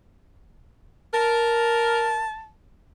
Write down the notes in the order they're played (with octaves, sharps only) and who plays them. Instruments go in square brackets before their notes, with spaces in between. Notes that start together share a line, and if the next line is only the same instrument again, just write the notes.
[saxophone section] A#4 [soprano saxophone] A5